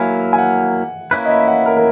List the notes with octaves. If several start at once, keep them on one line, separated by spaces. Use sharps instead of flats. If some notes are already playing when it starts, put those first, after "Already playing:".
Already playing: F#3 A#3 E4 G#5
G#5
F#5
A#3 C#4 E4 B4
D#5
E5
F#5
A#4
A#4